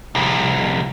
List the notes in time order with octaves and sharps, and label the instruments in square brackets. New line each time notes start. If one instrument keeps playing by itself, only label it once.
[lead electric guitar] C2 F2